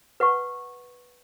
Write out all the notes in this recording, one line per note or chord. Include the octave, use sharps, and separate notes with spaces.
B4 F#5 C#6